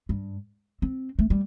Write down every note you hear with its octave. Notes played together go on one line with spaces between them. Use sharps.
G2
C4
A3
G3